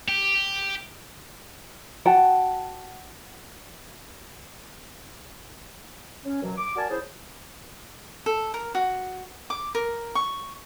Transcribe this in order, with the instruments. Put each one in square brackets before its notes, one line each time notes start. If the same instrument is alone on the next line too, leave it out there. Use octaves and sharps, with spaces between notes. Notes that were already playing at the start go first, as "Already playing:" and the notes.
[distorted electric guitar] G4
[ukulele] F#4 F#5 G5 A5
[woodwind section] C#4
F#2 B2 E3 F#3
D6
F#4 A#4 D5 G#5 A5
C#4 E4 G#4 C5
[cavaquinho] A4
A#4
F#4
D6
A#4
C#6